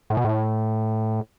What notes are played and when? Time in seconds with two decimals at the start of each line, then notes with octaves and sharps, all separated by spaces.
0.10 A2
0.17 B2
0.25 A2